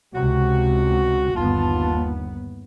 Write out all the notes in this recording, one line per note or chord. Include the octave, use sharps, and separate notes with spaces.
C#2 C3 F#4
G1 D#2 B3 F4 A5